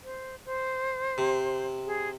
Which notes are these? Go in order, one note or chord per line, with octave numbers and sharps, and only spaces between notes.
C5
C5
C3
G#4